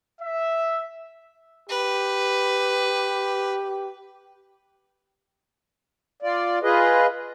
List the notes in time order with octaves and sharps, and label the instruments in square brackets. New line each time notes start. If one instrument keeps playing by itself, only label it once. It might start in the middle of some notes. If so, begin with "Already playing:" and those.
[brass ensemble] E5
[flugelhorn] G4 [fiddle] B4
[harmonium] F4 D5
F4 G#4 B4 D#5